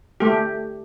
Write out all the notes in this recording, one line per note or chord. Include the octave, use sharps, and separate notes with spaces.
A3 G4